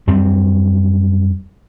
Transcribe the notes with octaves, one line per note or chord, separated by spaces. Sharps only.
F#2 G3 C4